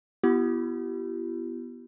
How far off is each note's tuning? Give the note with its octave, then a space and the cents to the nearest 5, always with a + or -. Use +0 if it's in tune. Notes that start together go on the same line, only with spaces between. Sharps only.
B3 +0 E4 +35 G4 -25